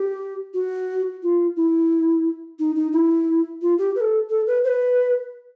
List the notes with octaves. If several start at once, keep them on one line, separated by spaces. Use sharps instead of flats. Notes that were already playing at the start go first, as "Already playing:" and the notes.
Already playing: G4
F#4
F4
E4
D#4
D#4
E4
F4
G4
B4
A4
A4
B4
C5
B4